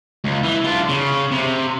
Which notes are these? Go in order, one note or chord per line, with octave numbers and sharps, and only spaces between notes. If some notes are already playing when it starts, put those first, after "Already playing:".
C#2
E3
D4 F4
C#3
C3